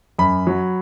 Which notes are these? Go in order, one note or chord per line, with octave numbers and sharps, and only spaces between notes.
F#2 B5
F#3